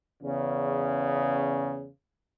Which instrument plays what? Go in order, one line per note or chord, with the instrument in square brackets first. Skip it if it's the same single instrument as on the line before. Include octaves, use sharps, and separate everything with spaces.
[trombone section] E2 C#3